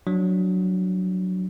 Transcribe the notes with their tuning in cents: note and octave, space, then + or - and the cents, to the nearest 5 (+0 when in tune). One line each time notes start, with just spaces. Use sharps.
F#3 +0 D4 +0